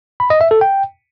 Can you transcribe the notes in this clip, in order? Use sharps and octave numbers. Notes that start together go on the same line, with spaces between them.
B5
D#5
E5
A4
G5